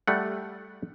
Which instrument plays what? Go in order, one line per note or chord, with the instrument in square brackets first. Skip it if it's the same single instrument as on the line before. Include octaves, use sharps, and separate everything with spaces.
[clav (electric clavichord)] G3 A3 F#5